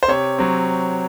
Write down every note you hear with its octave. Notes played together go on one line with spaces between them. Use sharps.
C5
C3 C#5
F#3 C4